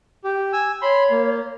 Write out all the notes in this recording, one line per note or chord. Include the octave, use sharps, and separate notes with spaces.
G4
G#5 E6
C#5 B5 C6
A#3